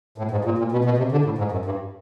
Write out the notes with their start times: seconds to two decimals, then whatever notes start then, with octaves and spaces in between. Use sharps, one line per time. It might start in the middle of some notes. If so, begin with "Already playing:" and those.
0.18 A2
0.31 G#2
0.45 A#2
0.58 A#2
0.72 B2
0.85 B2
0.98 C3
1.12 D3
1.25 A2
1.38 G#2
1.52 F#2
1.65 G2